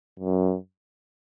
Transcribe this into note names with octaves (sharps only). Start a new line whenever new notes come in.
F#2